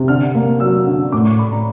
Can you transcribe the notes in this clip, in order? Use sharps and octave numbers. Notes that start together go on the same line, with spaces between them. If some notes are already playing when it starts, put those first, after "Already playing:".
Already playing: C3
D3 F6
A#3
F#3 E6
D3
A2 D6
C#6
A3 B5
A#5